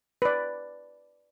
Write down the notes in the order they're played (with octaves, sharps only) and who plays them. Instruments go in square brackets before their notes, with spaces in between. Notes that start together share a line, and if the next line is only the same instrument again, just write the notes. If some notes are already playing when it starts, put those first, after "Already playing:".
[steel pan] B4 D5